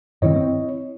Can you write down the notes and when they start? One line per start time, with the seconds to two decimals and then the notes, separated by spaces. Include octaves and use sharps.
0.22 G2 D#3 C4 E4 C#5 D#5
0.36 C4